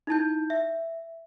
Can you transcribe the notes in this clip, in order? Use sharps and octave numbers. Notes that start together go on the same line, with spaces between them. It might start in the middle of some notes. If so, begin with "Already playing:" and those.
D#4 E4 A5 G6
E5